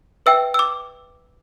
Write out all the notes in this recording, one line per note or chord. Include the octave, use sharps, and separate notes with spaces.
B4 E5 G5 E6
E6
D6